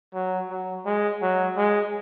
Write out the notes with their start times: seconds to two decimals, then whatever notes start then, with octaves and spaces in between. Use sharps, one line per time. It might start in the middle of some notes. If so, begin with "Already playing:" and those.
0.14 F#3
0.50 F#3
0.86 G#3
1.22 F#3
1.57 G#3